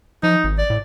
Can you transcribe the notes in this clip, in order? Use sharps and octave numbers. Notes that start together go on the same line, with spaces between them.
F3 D#4
G#1
D5
A2